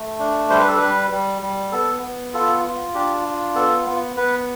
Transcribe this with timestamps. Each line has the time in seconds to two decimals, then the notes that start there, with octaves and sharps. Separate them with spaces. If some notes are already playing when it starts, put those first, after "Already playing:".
Already playing: A3
0.19 D4
0.50 G3 C5
0.59 B4
0.68 A4
0.77 G3 B4
1.11 G3
1.42 G3
1.72 B3 A4
2.02 B3
2.34 F4 A4
2.64 F4
2.94 D4 G4
3.25 F4
3.55 B3 A4
3.86 B3
4.17 B3 B4